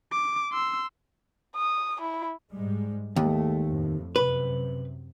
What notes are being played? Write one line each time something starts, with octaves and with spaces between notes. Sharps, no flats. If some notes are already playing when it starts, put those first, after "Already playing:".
D6
C6 E6
D#6
E4
G#2 G3 G#3
D#2 G#3 A3
F2 A2
F#2 C3 B4